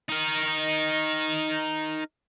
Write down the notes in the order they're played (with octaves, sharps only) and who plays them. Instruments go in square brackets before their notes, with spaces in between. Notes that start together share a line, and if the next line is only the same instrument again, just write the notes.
[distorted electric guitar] D#4 A#4